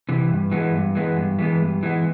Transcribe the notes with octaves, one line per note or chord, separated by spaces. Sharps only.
C3 E3
G2
E3 G#3 B3
G2
E3 G#3 B3
G2
E3 G#3 B3
G2
E3 G#3 B3